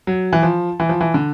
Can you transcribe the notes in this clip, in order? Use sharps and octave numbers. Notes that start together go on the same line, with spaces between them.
F#3
E3
F3
E3
F3
E3
D3